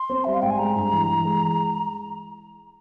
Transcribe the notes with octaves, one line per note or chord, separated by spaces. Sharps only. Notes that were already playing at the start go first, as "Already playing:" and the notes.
Already playing: C6
C4
G3 E5
F5
G#2 G5
G#5
G#3 A#5
G2
E3
E3
G#3